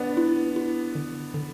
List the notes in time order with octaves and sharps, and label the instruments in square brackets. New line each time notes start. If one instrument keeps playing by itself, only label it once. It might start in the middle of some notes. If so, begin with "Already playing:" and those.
Already playing: [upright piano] B3 D4
[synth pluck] E4
E4
D3
D3